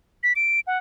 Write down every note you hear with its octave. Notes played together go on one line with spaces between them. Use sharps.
B6
D7
F#5